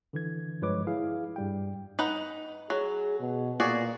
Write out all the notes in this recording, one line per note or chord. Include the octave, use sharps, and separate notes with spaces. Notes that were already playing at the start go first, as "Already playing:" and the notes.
D3 E3 G#6
G2 F3 G#3 B4 C#5 D6
E4 G#4 F5
G2 G3 G5
D#4 B4 F#5
F#3 G#4
B2
A#2 F#4 G#4 D5